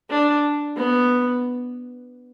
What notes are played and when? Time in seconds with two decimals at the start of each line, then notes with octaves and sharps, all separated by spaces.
0.09 D4
0.77 B3